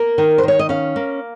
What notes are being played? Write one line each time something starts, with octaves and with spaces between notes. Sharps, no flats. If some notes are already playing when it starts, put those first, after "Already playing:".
Already playing: A#3 A#4
D#3
C5
D#3 C#5
D#5
C#4 F5
A#3